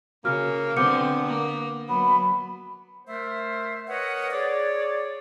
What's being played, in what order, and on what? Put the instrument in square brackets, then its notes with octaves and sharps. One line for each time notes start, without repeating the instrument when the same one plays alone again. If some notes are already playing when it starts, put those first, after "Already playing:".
[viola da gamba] C#3 [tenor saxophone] A#3 [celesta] F#4 F6
[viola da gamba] D3 C4 [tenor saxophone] B3 [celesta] D6 G6 C#7
[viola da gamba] A#3
[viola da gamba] F#3 [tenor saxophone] B3 [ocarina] B5
[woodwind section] A3 A#4 C5 E5
A#4 B4 C#5 D#5 F#5
G#4 C#5 D5